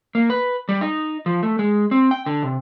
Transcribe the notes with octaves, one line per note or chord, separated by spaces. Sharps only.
A#3
B4
G3
D#4
F3
A3
G#3
C4
G5
D3
C3